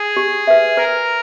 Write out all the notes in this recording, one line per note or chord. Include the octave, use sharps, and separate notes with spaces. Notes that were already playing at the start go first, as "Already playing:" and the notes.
Already playing: G#4
G4
B4 E5
A#4 B4